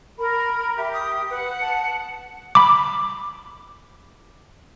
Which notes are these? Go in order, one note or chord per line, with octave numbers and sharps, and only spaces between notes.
A#4 B5
G4 E5
D#6
B4 F#5
A5
B5 D6